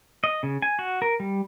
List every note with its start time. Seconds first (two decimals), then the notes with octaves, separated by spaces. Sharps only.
0.24 D#5
0.43 C#3
0.62 G#5
0.79 F#4
1.02 A#4
1.20 G3